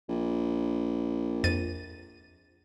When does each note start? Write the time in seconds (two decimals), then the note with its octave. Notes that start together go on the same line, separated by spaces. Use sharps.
0.09 A#1
1.44 F2 A6 D#7